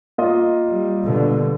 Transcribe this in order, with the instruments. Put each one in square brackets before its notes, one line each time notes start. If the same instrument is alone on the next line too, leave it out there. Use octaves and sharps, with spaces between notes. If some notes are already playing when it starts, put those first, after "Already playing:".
[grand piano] A#3 F4 D#5
[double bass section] G3
B2 D3 G3